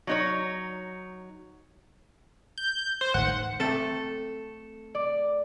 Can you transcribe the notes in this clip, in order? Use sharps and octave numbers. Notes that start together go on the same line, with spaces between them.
F#3 D#4 C#5
G6
C5
D1 G#1 D#3 F#5
A3 C4 A4 E5 G5
D5